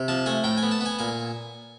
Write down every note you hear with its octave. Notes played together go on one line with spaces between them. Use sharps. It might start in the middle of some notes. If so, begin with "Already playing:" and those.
Already playing: C3
F3 A5
A3 G#5
A2 G5
G#5
B3
A5
B3 G#5
A#2 G#5